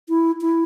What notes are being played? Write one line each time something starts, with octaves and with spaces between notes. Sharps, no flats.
E4
E4